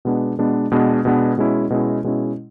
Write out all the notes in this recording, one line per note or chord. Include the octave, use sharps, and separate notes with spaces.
B2 G#3 B3 D4
B2 G#3 B3 D4
B2 G#3 B3 D4
B2 G#3 B3 D4
B2 G#3 C#4 E4
B2 G#3 C#4 E4
B2 G#3 C#4 E4